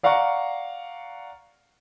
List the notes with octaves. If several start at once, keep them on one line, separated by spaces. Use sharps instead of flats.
D5 F5 F#5 A#5 C#6